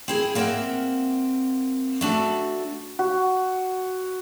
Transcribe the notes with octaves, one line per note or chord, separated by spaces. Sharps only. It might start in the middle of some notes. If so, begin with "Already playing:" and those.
C4 E4 G#4
A#3 C4 A#4 D5 E5 F#5
A3 D4 F#4 A4
F#4